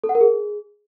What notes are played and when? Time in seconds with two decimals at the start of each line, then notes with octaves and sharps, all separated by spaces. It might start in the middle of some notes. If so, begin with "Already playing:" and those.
0.04 A4
0.09 F#5
0.15 A#4
0.21 G#4